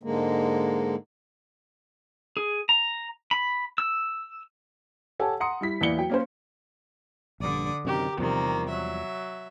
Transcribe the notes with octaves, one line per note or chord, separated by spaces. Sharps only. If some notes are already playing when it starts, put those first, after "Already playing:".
G#2 D3 G#3 A#3
G#4
A#5
B5
E6
G4 A4 C#5 F#5 G#5 A5
F#5 A#5 C6 D#6 C#7
G3 E4 B6
E2 A#3 E4 D5 C#7 G7
F#3 G5
A#3 C#4 C5
A#1 G2 D3 D5 D#6
F#2 C3 D#3 G4 A#4
E2 C3 D#3 F3 G3 A#3
F#3 E5